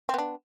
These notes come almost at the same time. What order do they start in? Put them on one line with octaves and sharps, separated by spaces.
C4 B3 D4